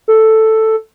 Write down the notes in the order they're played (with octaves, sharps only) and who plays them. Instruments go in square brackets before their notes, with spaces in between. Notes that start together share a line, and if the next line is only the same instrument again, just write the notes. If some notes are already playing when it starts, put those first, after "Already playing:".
[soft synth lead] A4